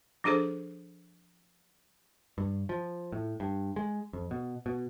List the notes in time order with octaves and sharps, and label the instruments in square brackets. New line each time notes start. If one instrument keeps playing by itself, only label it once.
[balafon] F3 D4 G#4 A4 C5
[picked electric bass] G2
F3
A2
G2
G#3
F2
B2
B2